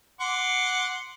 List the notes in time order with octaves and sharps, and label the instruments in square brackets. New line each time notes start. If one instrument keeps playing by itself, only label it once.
[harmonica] F#5 C6 D6